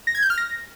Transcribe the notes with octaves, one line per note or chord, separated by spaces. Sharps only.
A#6
G#6
G6
F6
A#6